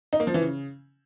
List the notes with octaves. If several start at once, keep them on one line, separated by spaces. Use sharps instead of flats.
D#4
A#3
F3
E3
C#3